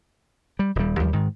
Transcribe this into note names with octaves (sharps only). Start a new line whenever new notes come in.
G3
D#1 G3
D#2 F3 G3
G#2 D#3